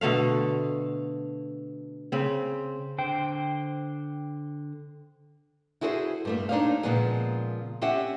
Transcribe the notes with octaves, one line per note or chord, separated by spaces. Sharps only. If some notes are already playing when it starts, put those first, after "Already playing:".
B2 D3 A3 F5
C#3 C4
D3 C5 G5
E4 F#4 G#4 A4 B4 C5
G2 A3 A#3
D4 D#4 G#4 C5 C#5 F5
A#2 C#3 F3 G#3 B3 G#4
C4 C#4 G4 E5 F#5